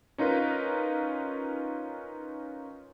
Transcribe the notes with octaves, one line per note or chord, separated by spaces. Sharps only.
C#4 D#4 F4 A#4 B4